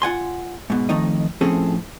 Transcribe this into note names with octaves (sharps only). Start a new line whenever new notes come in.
F4 F#5 G#5 C6
G#2 B2
F2 D#3 A3 D#4 D#5
A2 F3 C4 C#4 G#4 A4